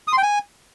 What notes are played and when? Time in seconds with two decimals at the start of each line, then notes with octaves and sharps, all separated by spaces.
0.08 D#6
0.13 C6
0.18 G5
0.23 G#5